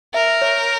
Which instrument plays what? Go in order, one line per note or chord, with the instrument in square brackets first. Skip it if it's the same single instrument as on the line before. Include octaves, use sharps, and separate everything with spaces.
[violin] A#4 [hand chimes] E5
[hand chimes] C#5